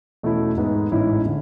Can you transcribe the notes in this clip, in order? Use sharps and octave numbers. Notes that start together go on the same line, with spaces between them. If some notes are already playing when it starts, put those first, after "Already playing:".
E2 B2 A3 C#4 E4
G#2 G#3 B3
A1 G#2 G#3 C#4 E4
D3